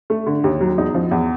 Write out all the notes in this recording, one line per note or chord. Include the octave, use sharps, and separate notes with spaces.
A3
D3
D#2
F#3
E2 D#4
F3
E2